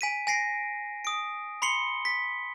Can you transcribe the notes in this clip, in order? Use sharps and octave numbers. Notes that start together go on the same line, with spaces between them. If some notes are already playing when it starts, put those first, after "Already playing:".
G#5 B6 D#7
G#5 A#6 C7 D7
D#6 D7
B5 C6 C7 C#7 G7
B6